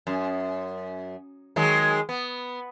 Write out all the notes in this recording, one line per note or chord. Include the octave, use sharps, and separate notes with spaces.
F#2
D#3 F#3 G#3
B3